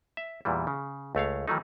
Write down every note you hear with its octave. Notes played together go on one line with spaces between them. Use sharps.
E5
E2 A#2 E3 G3
C#3
C#2 A3 C#5 F5
D#3 E3 F#3 A3 D#4